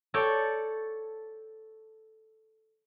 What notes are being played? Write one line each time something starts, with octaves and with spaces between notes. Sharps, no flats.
A4 C#5 D5 G5